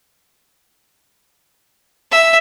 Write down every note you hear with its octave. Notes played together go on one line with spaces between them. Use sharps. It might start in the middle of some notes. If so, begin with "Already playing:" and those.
E5